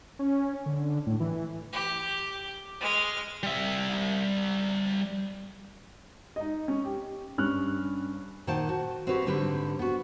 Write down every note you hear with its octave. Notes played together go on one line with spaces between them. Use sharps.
C#4
D3
A2
E3
G4
G#3 F6
G3 E5
D#4 D#5
C#4
G4
G2 C#4 F6 F#6
A#2 D#3 C5 F#5 G5 A5
F#4
C4 F#4 G4 B4 C#5
G#2 D3 G3 C4 B4
B3 F#4